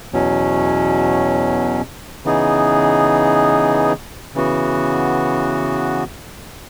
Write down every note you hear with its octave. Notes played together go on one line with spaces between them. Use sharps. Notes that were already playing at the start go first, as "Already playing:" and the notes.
E2 B2 F#3 C#4
C#3 E3 B3 D#4 G#4
C#3 E3 B3 F#4